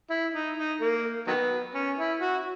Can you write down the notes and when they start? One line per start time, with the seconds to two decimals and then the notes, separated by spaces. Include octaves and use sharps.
0.10 E4
0.34 D#4
0.57 D#4
0.80 A#3
1.27 D#3 F#3 B3
1.74 C#4
1.98 E4
2.21 F#4